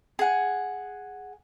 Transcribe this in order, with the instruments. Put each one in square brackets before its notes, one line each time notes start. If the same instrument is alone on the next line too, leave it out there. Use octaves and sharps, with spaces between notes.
[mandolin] G#4 F#5